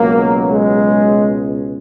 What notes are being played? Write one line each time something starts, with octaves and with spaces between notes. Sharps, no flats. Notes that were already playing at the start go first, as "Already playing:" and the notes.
Already playing: C#2 B2 F#3 A#3
G#3